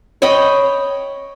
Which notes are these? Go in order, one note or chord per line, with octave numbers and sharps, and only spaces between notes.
C#5 D#5 G5 B5